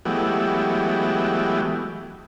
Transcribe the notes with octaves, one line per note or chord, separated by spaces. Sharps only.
E3 F#3 G#3 A3 B3 G4